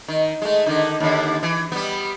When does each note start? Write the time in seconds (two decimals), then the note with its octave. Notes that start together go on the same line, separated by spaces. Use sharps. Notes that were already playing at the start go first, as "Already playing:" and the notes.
0.08 D#3
0.42 G#3 A3
0.66 D3 D#3 D#4
1.00 D#2 D3
1.43 E3
1.72 G3 B3